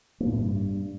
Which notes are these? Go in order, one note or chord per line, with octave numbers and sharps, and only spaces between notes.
A#3
B2
A2
G2